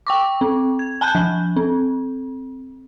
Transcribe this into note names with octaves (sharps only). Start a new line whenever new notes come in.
G5 C#6 D6
C4
G#6
G#5 A5 B5 F#6 G6
F3
C4